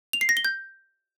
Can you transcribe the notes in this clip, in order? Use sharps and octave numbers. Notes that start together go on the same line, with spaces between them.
F7
C7
A#6
G7
G6